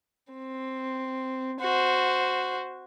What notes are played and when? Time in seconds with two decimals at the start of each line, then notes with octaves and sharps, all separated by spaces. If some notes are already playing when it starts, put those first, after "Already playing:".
0.33 C4
1.60 F#4 C5